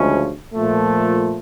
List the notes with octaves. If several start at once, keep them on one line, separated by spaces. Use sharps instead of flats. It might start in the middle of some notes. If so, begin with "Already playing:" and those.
Already playing: D2 C#3 F3 G#3 C#4
A#2 F3 A3